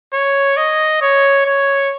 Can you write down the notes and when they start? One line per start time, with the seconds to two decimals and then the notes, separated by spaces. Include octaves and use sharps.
0.13 C#5
0.57 D#5
1.02 C#5
1.46 C#5